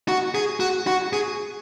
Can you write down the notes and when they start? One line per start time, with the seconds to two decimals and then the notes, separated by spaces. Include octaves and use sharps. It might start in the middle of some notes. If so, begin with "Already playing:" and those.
0.08 F#4
0.35 G#4
0.60 F#4
0.87 F#4
1.13 G#4